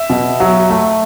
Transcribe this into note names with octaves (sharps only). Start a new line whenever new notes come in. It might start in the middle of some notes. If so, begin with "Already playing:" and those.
Already playing: E5
B2
F#3
A3